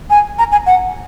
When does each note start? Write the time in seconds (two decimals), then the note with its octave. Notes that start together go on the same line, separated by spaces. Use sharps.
0.10 G#5
0.39 A#5
0.52 G#5
0.66 F#5